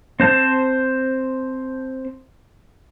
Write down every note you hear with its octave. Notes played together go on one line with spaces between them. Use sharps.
C4 C5 A5